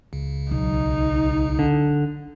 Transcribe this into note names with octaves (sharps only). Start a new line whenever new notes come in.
C#2 C#3
B1 D#4
D3